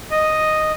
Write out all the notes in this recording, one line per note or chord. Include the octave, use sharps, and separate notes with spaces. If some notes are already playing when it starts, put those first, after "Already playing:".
D#5